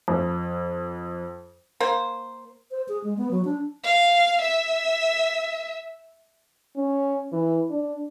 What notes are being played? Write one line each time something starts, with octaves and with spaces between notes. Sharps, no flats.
F2
A#3 C5
C5
G#4
G#3
B3
F#3
D4
F5
E5
C#4
E3
D4